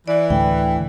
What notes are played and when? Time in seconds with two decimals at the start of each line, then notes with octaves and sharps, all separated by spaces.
0.08 E3 D5
0.30 D2 A2 G5